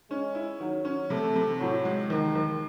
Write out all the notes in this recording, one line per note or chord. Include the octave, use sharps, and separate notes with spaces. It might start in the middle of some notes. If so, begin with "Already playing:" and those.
G#3 C#4
E4
D#3 F#3
C#4
C3 A3
C3
A2 F#3
G#3
D#2 D#3
D#2